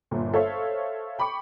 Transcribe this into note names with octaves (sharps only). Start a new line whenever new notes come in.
G1 A#2
A4 C5 C#5 E5 F5
G5 B5 C#6 D6 C#7